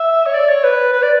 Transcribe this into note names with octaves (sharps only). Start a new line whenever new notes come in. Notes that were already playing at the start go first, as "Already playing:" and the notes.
Already playing: E5
C#5
D5
C#5
B4
B4
D5